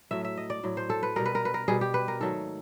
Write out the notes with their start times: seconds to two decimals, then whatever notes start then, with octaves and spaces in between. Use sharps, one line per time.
0.11 A2 F#3 A3 E5
0.25 E5
0.37 D#5
0.50 D5
0.63 A2 F#3 A3
0.77 C5
0.90 A4
1.03 B4
1.16 B2 G3 A#4
1.26 B4
1.35 A#4
1.45 B4
1.54 A#4
1.68 B2 G3 G#4
1.81 G4
1.94 B4
2.08 A#4
2.20 G#2 D#3 F#3 A3 A4